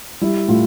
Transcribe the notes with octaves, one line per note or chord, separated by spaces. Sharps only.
G3 E4
A2 F4